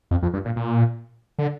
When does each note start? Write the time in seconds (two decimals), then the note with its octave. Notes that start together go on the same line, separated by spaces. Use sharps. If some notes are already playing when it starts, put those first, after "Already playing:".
0.11 F2
0.22 F2
0.34 G2
0.45 A#2
0.56 A#2
1.39 D3